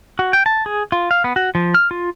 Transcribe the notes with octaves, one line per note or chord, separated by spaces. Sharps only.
F#4
G5
A5
G#4
F4
F5
B3
F#4
F3
F6
F4